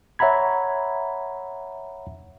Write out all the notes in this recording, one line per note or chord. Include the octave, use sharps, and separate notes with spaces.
C#5 E5 F#5 A#5 B5 G#6